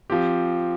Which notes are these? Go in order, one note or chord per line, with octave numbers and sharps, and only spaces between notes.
F3 C4 G4